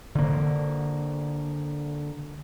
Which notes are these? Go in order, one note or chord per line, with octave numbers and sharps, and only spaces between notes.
D3 A#3